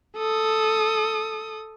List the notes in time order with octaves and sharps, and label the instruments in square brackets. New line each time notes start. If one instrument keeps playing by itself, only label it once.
[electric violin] A4 D#6